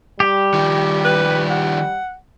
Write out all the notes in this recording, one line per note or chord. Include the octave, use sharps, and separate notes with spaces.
G3 G4
D#3 F3
B4
F#5